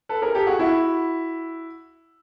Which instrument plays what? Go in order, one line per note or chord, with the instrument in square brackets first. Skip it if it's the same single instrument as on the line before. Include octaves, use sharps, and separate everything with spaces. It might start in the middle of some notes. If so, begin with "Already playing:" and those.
[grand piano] A4 B4
G#4 A#4
G4 A4
F#4 G#4
E4 F#4